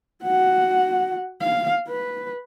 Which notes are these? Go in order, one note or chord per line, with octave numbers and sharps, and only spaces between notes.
F#4 F#5
F5
B4